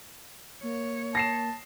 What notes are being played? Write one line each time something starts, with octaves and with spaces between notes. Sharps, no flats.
A#3 C#5
A5 A#6 C7 E7